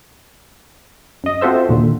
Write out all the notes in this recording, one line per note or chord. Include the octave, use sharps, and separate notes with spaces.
F#2 D#5
C4 F4 F#4 A4 C5 E5
D#2 A#2 D3